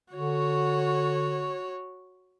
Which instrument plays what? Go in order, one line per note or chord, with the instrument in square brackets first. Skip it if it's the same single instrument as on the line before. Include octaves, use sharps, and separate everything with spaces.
[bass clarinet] D3 [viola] F#4 C#5